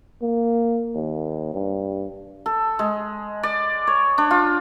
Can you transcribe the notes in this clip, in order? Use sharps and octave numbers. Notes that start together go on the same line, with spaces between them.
A#3
D#2
G2
A4
G#3
D5
C#5
D4
F4